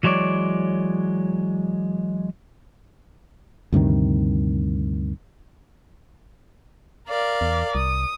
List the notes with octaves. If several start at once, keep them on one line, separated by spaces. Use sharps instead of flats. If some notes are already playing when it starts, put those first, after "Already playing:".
E3 F#3 G#3 C#5 D5
D2 G2 C3 D#3
A#4 D5 F5
E2
C2 D#6